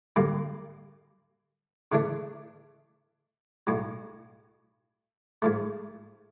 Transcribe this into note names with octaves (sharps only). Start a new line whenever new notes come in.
F#2 D3 G3 A#3
C#3 E3 A3 D4
B1 A2 F#3
G#2 F3 A3